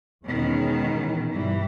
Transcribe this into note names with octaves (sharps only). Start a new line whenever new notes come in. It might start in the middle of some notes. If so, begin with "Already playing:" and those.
E2 B2 D#3 G#3 C#4
A#2 E3
G2 B2 E3 G3